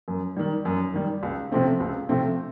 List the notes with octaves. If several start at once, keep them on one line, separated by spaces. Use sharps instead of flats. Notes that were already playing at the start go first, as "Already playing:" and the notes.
F#2
D#3 G3
F#2
D#3 G3
C#2
C3 F3 A3 C4
C#2
C3 F3 A3 C4